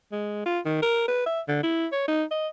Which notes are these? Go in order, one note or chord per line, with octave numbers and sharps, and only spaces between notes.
G#3
F4
D#3
A#4
B4
E5
D3
E4
C#5
D#4
D#5